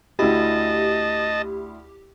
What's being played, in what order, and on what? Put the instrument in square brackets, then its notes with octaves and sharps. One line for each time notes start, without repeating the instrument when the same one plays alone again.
[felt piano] D2 E4 [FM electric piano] G4 [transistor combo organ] D#5 A5